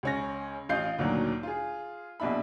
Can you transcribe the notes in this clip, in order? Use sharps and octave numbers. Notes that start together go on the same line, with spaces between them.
C#2 C#4 A#6
A1 F4 D#5 F5 G6 C7
D2 A#2 D#3 F#3 D4
F4 G#4
A#1 B2 D4 E4 B5